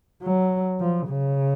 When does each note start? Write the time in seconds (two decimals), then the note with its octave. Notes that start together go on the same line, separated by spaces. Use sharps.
0.22 F#3
0.80 F3
1.08 C#3